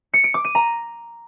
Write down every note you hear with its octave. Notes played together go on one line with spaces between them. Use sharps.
C#7
D7
D6
D#7
A#5